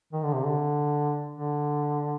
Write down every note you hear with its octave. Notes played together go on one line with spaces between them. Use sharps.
D#3
D3
C3
D3
D3